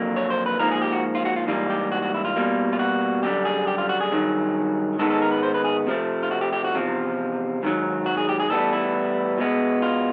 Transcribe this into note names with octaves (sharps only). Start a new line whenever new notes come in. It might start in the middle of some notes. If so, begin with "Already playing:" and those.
Already playing: F2 D3 F#3 A#3
C#5
C5
B4
G#2 F3 A#3 A#4
G#4
G4
F#4
F4
F#4
F4
G#2 E3 G3 A#3 F4
G4
F#4
F#4
E4
F4
B2 G3 A#3
F4
F#4
F#2 D3 G3 G4
G#4
G4
F4
F#4
G#4
G2 D#3 F#3
G#2 D#3 G#3 B3 A4
A4
A#4
B4
C5
B4
G#4
C3 F3 A3
F4
F#4
G4
G4
F#4
E2 C3 F3 F4
G#2 D#3 F#3
F#4
G#4
G4
G#4
A2 E3 G3 B3 A4
E4
B2 G#3 B3
F4